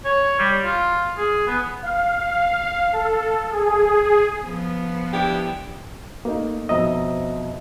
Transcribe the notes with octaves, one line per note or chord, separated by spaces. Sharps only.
C#5
G3
F4
G#4
B3
F5
A4
G#4
F3 B3
D4 E4 G4
A3 A#3 D#4
F2 B2 F3 D#5 E5 A#5